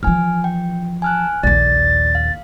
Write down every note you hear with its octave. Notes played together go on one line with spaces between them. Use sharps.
E3 F3 G#5 F6
G5
G#5 A5 F6 F#6
A#1 D#2 D5 A6
F5